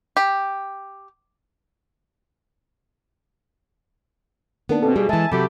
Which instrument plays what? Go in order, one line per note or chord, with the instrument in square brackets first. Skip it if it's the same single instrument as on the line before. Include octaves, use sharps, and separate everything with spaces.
[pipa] G4
[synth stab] D#3 A#3 D4 [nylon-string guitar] B3
[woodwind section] G2 B2 [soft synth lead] C4 [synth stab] A4
[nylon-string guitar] G3 [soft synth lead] G#4
[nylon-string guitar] E3 G#3 [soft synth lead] E5 [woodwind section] G#5 A5
[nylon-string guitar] C3 F#3 [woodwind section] A3 G4 [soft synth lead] B5